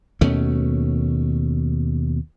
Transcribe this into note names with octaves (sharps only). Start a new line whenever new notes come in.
D#2 B2 A3 C#4